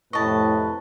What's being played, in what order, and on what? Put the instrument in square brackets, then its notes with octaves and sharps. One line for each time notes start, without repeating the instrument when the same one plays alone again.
[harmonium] F2 C3 B4 [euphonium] A2 [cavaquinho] D#5 A5 [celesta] C#6